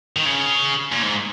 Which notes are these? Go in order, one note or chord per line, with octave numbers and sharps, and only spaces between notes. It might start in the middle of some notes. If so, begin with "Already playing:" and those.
D#3
C#3
A#2
G#2